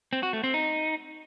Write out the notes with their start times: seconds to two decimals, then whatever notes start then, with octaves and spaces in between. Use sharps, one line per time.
0.13 C4
0.23 F#4
0.33 A3
0.44 C4
0.54 D#4